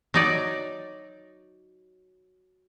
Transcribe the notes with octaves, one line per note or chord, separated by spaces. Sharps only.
F#3 D#4 D5